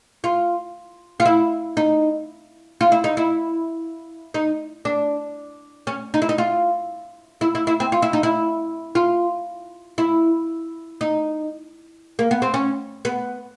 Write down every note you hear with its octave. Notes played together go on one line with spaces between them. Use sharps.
F4
F4
E4
D#4
F4
E4
D#4
E4
D#4
D4
C#4
D#4
E4
D#4
F4
E4
E4
E4
C4
F4
E4
D#4
E4
F4
E4
D#4
A#3
B3
C4
C#4
B3